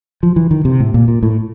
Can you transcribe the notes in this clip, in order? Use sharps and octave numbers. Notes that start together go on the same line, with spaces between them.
F3
E3
D#3
C3
A2
A#2
A#2
A2